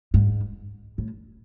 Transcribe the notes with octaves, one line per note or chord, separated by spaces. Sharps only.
G#2
A2